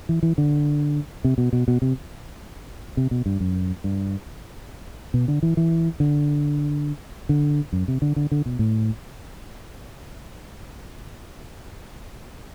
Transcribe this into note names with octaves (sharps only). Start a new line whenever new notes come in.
E3
E3
D3
C3
B2
B2
B2
C3
C3
B2
G2
F#2
G2
B2
D3
E3
E3
D3
D3
F#2
C3
D3
D3
D3
B2
A2